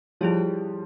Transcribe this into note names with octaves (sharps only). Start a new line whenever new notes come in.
F3 G3 E4 G#4 C#5